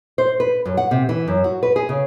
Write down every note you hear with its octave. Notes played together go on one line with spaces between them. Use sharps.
C5
B4
F#2
F#5
C3
E3
F#2
F#4
B4
G#4
C#3